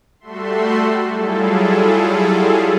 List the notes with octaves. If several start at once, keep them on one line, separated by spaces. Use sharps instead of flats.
G3 A3 F#4 A4 E5 C6
F#3 G3 E4 F4 G#4 A4